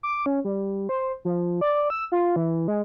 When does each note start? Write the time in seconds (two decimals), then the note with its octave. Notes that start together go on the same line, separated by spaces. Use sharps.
0.03 D6
0.26 C#4
0.45 G3
0.89 C5
1.25 F3
1.61 D5
1.90 E6
2.12 F4
2.36 E3
2.68 G#3